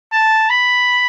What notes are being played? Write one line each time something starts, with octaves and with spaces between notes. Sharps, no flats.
A5
B5